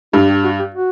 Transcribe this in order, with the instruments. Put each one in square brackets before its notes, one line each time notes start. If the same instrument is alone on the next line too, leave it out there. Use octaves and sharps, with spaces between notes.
[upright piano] G2 [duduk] E4
[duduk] G4
F#4
G4
F#4